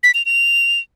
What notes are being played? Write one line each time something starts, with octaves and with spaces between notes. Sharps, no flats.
B6
F7
F7